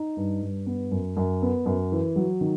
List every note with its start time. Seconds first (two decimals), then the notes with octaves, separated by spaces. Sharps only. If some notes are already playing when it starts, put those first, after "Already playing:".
Already playing: D#4
0.17 G2
0.42 G2
0.66 B3
0.92 F#2
1.17 F#2
1.42 B3
1.66 F#2
1.92 E3
2.16 F#3
2.41 D#3